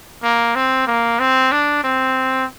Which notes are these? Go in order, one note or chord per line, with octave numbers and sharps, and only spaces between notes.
A#3
C4
A#3
C4
D4
C4